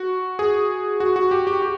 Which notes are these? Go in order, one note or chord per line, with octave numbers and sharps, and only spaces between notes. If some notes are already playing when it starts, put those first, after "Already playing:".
Already playing: F#4
G#4
F#4
F#4
G4
G4
G4